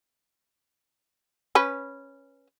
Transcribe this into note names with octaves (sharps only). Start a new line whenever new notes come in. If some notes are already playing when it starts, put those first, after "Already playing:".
C#4 B4